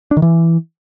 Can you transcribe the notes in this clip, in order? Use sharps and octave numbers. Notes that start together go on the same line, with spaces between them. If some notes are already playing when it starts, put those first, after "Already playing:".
D4
D#3
E3